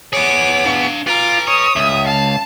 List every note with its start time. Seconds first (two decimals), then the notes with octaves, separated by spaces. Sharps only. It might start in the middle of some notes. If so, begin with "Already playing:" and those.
0.13 B3 G#4 C#5 D6
0.66 D4 F5
1.07 F4 B4 A#5 D6
1.47 C#5 D#6
1.76 C#2 E5
2.07 F5 A5